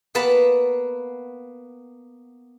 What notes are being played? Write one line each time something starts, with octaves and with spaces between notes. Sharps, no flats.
A#3 B3 B4 A5 B5